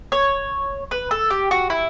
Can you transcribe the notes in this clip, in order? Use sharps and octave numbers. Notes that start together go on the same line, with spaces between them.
C#5
B4
A4
G4
F#4
E4